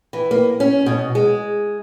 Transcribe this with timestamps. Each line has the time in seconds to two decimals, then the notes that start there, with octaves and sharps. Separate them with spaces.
0.13 E3
0.31 A#3
0.60 C#4
0.86 B2
1.15 G#3